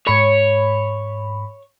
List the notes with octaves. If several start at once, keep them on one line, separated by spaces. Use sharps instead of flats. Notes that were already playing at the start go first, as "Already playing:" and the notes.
G#2 C#5 B5